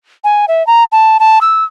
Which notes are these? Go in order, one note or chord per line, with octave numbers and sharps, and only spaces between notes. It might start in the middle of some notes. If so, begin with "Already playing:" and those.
G#5
E5
A#5
A5
A5
E6